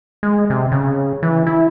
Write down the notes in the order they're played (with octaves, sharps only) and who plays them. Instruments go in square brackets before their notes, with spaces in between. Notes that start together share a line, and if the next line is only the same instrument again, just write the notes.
[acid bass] G#3
C3
C#3
E3
E4